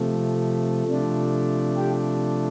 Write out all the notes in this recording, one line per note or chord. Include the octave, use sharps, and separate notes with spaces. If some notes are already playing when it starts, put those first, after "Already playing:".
Already playing: C3 F3 A3
C3 F3 A3 D4
G4